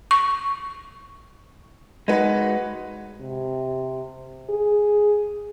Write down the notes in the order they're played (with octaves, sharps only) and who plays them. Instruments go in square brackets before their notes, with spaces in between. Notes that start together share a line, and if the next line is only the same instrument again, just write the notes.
[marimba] C#6
[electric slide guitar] G#3 F#4 [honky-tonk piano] D#4 B4
[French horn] C3
G#4